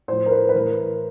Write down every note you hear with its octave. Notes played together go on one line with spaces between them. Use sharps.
A2 F3 C5
A#4
B4
B4
A2 E3 A#4